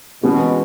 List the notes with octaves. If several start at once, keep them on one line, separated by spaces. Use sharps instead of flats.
B2 E3 G#3 C#4 F#4